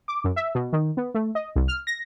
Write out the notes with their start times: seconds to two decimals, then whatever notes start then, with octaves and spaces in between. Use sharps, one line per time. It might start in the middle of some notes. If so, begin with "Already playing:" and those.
0.08 D6
0.24 F#2
0.36 E5
0.55 B2
0.73 D#3
0.97 B3
1.14 A3
1.35 D#5
1.56 C2
1.68 F6
1.87 A#6